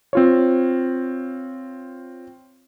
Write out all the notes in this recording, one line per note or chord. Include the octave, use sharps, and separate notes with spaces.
C4 F4 C#5